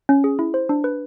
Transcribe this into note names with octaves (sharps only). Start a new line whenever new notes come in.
C#4
G#4
E4
C5
D4
B4